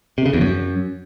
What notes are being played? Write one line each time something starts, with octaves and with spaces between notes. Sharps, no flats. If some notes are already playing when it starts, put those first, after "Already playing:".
C3
C#3
E2
F#2